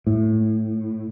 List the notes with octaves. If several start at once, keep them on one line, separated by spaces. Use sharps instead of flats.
A2